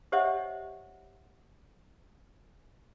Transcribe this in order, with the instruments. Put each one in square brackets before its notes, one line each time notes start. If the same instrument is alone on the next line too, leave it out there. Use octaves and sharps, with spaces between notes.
[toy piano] G4 C5 C#5 D#5 E5 F#5